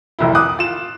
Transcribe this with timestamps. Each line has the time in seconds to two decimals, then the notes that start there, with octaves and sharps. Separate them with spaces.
0.19 F1 C2 E4
0.35 D6 D#6 F#6
0.59 F4 E7